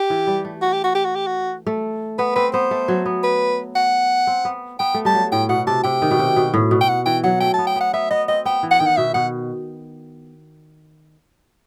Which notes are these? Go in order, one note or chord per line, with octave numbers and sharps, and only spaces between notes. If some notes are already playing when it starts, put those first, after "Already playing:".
Already playing: G4
E3
G3
A3
F#4
G4
F#4
G4
F#4
G4
F#4
A3
B3 B4
C4 B4
B3 C5
A3
F#3
B3
B4
F#5
C4
B3
B3 G5
A3
G3 A5
F#3
A2 G5
B2 F#5
C3 A5
C3 G5
D#3
B2
C3
B2
A2
B2
G5
F#5
E3 G5
F#3 F#5
A3 G5
A5
B3
G5
B3
F#5
B3 E5
B3 D#5
C4 D#5
B3 G5
E3
F#5
D#3 G5
F#5
B2 E5
B2 F#5